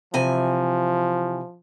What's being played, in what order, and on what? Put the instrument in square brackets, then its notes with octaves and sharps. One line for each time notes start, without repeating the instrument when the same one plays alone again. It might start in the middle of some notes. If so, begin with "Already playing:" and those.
[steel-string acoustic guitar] C3 E3 G#5 [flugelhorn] F3